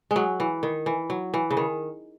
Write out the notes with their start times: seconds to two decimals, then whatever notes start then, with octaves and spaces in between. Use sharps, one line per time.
0.11 G#3
0.16 F#3
0.40 E3
0.63 D#3
0.86 E3
1.10 F#3
1.34 E3
1.51 C#3
1.57 D#3